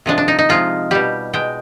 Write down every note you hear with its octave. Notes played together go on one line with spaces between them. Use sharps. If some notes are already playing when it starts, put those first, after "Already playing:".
C3 F3 G#3 D4
D4
D#4
D#4
C3 F3 G#3 F4
B2 G3 G4
B2 G#3 G5